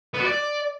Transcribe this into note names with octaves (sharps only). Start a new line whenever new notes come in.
B3
F#4
D5